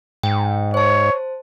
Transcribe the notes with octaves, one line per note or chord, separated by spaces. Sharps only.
G#2 G5
C5 C#5 A5